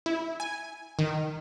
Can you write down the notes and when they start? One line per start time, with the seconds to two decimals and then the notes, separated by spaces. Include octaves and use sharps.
0.06 E4
0.40 G#5
0.99 D#3